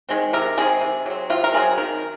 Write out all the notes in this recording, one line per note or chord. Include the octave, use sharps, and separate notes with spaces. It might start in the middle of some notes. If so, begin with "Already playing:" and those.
D#3 G#3 C4
C3 A#4
D#3 G#3 C4 G#4
C3
F#3 C4
C3 F4
A#4
F#3 C4 G#4
D#3 A#4